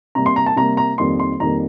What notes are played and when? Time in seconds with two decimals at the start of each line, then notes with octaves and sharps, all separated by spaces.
0.15 C3 G3 A#3 A#5
0.26 C6
0.36 A#5
0.46 A5
0.56 C3 G3 A#3 A#5
0.77 A#5
0.98 F2 D#3 G3 A#3 C6
1.19 C6
1.40 F2 D#3 G3 A#3 A#5